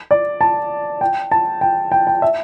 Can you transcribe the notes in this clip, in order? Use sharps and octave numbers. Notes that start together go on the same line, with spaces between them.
D5
A5
G5
A5
G5
G5
G5
E5